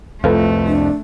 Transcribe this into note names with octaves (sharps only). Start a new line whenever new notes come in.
C2 F2 A3 F4 A4 B4
D4